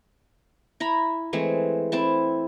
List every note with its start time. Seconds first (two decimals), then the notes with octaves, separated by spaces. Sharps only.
0.80 E4 A#5 B5
1.33 E3 G#3 A3 C4
1.92 C4 E4 A5